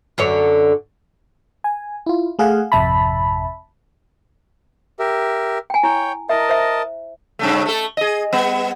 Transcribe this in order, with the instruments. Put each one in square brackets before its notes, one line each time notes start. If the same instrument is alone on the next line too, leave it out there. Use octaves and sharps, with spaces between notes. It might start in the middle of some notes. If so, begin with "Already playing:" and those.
[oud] F#2 D3 C#5
[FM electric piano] G#5
E4 F4
A3 G#4 F5 F#5 G#5
G#1 F2 C3 E5 A5 B5
[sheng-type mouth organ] G4 A#4 E5
[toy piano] G5 G#5
[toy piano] E4 [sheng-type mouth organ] C#5 G5
[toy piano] E4 E5 [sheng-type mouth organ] A#4 D#5 A5
[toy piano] C5 E5
[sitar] G2 C#3 A3
A3 A4
G#4 D#5
G3 B3